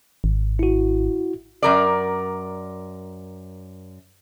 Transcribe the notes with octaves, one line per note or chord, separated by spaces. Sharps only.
G#1
E4 F#4
F#2 A#4 D5